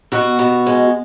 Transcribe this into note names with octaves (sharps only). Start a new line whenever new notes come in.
B2 F#4
B2
G#3